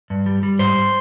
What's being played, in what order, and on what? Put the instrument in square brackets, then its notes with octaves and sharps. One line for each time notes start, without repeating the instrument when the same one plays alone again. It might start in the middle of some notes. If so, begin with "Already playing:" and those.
[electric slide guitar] G2
G3
G3
G#2 C5